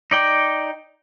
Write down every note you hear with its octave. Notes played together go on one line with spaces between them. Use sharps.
D#4 D5 G5